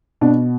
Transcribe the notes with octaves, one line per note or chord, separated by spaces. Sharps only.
B2 D4